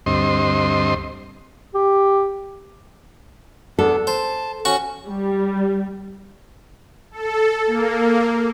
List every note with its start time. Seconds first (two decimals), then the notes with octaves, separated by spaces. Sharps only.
0.06 D2 G2 C4 D#5 C6
1.75 G4
3.79 E2 B3 D4 A4
4.07 C5 A5
4.65 C#4 F#4 C#6
5.06 G3
7.11 A4
7.67 A#3